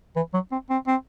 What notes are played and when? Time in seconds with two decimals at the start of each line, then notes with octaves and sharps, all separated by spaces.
0.16 E3
0.34 F#3
0.52 C4
0.70 C4
0.87 C4